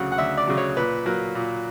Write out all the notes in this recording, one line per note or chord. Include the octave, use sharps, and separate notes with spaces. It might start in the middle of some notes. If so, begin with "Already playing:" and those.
Already playing: D2 C#3 F#3 F#5
F#5
D2 E5
D5
C#3 F#3
C#5
A#2 B4
F#3 A#3
A#2